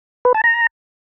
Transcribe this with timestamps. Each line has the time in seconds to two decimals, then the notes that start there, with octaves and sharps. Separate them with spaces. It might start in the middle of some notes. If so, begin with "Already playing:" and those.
0.25 B4
0.34 A5
0.44 A#5